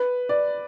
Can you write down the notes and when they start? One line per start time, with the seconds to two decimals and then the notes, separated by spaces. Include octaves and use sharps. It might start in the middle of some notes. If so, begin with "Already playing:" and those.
Already playing: B4
0.29 D5